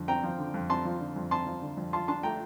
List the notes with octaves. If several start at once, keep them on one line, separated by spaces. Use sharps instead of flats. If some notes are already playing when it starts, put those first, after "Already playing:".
Already playing: F2 D3
C4 G5 A#5
F3
D3
F2
C4 A5 C6
F3
D3
F2
C4 A5 C6
F3
D3
F2
F4 A5 C6
D4 A5 C6
A3 G5 A#5